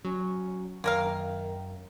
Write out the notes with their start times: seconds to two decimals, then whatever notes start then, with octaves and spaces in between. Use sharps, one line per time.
0.05 F#3 C#4
0.84 F#2 D#3 A#3 A#4 F5